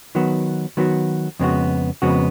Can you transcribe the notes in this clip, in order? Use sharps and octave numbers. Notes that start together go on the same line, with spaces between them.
D#3 F#3 B3 F#4
D#3 F#3 B3 F#4
F2 C#3 G#3 B3 F#4
F2 C#3 G#3 B3 F#4